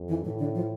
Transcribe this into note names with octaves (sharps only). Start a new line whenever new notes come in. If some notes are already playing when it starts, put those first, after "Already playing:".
Already playing: F2
E3
A2 E3
D3
F3